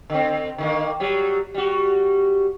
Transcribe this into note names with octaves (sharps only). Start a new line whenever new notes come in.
D3 C4
D3 D#3 A#3
F#3 G3
G3 F#4